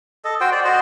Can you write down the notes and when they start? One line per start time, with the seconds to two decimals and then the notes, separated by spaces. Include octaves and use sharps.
0.24 A4 D#5
0.41 F#4 C5 G5
0.52 D5
0.65 F#4 C5 D#5